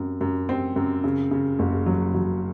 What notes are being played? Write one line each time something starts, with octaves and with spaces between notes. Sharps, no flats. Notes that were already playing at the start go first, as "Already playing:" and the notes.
Already playing: F#2 C4
F#2
C4
F#2
C#3
C#3
F#1
F#3
F#3